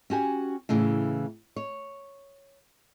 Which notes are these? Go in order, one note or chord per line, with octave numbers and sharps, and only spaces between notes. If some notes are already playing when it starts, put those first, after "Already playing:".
C#4 F#4 G4 G#5
A2 C#3 E3
C#5